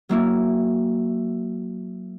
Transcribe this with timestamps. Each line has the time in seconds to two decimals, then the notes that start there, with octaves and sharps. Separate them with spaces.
0.09 F#3 A#3 E4